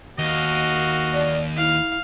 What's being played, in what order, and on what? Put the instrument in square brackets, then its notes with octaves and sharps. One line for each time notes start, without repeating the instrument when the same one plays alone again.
[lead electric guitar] D#2 [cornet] F#4 [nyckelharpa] D#5 F5
[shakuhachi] D5
[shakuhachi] E4 [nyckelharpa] F5